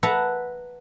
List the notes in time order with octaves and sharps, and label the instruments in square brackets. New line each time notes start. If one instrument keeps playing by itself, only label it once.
[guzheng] B4 E5 F#5 A5 A#5